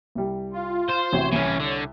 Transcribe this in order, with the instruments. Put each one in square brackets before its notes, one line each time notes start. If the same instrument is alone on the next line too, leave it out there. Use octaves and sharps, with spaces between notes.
[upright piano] C2 G3
[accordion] F4
[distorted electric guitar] C5 [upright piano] E7
[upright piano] A1 C3 F#4 [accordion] C#5
[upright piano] C2 [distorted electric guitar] E3 C#4
[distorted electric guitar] D3